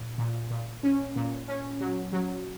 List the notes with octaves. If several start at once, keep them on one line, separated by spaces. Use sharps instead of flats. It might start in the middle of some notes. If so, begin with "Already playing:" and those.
Already playing: A#2
A#2
A#2
C#4
A#2
C#4
F#3
F#3